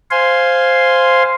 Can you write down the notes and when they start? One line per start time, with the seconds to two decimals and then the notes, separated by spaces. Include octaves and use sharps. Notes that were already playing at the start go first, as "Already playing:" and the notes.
0.11 C5 F5 G#5 C6